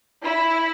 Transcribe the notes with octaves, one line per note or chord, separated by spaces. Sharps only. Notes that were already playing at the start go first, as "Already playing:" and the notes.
E4